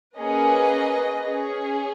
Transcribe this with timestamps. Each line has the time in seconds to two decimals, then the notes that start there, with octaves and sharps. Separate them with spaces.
0.18 A#3 C#4 G#4 B4 D#5
1.24 C#4 G#4